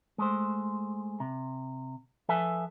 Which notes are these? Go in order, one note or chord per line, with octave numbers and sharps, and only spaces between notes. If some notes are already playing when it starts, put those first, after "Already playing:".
G#3 A3 C5
C3
F3 A4 B4 E5 G#5